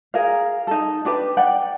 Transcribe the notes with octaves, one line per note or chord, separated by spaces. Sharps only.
G#4 A#4 F5
D#4 A4
D4 G4 B4
D5 F#5 G5